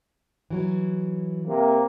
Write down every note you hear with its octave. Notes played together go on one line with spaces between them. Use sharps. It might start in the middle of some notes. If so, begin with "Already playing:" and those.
E3 F#3
C3 A#3